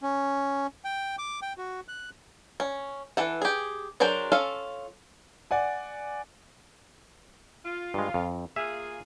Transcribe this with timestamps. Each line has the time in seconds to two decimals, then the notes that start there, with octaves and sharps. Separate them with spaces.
0.03 C#4
0.85 G5
1.19 D6
1.42 G5
1.58 F#4
1.88 F#6
2.60 C#4
3.17 E3 A4 F#5
3.42 G4 G#4
4.00 F#3 D4 G#4 A#4 C5
4.32 C#4 F4 A4 F5
5.51 D5 F#5 G#5
7.65 F4
7.94 G2 G#3
8.14 F2
8.56 A#3 F4 G#4 E5